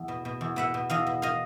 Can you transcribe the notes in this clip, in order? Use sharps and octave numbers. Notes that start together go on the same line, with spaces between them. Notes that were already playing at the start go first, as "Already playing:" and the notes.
Already playing: E2
B2
B2
E2
B2 E5 F#5
B2
E2 D#5 F5
B2
D#5 F5